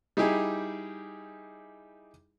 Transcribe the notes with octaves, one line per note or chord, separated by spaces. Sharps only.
G3 D#4 E4 G4 G#4